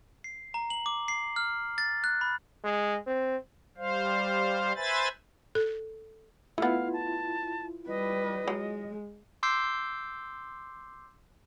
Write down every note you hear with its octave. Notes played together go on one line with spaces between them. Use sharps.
C7
A#5
F#7
D6
C7
F6
A6
F#6
B5
G#3
C4
G3 C5 F5
B4 C5 E5 G#5 B5 A6
A4
A3 B3 E4 F4 F5
A5
G3 B4 D#5
F#3 G#3
C6 D6 E6 G6 C7